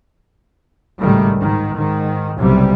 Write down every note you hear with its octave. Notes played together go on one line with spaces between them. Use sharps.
G#1 C#2 A2 D#3 G3 A3
G#2 D#3
G#2 D#3
F#1 B1 C3 G3